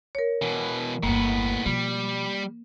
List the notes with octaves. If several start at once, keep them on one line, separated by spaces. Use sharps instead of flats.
A#4 C#5
B2 E3
G1 E2 A2 A#3 B3
B2 F3 G3